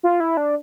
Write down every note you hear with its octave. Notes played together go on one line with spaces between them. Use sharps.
F4
E4
D4